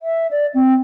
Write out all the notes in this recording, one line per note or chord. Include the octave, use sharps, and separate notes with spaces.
E5
D5
C4